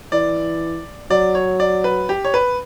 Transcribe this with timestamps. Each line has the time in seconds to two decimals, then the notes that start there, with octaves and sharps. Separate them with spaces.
0.12 E3 D5
1.10 F#3 D5
1.35 C#5
1.60 D5
1.84 B4
2.09 G4
2.25 C#5
2.34 B4